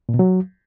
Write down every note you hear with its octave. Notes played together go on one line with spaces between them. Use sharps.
A#2
B2
F#3